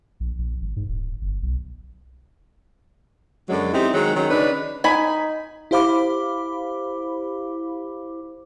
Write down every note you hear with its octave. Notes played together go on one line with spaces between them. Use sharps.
A#1
A#1
G#1
G#2
D1
G1
B1
F#2 D3 F#3 G#3
C4 D#4 E4 G4
D#3 F#3 G#3
D#3 F#3 C#4
C#3 D4 D#4 B4
D#4 G#5 B5
E4 G4 C5 F5 B5 D6